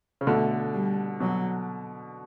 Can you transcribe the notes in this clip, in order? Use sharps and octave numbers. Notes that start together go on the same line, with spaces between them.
C#3
B2 D3 A3
G3
B2 F#3